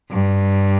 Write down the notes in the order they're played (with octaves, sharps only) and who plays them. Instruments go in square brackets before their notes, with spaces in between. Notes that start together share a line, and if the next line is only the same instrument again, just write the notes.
[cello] G2